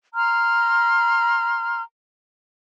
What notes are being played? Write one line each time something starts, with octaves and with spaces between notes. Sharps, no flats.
A#5 C6 F6